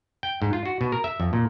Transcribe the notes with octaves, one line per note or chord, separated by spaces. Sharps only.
G5
G#2
F4
F#4
B2
A#4
E5
F2
A#2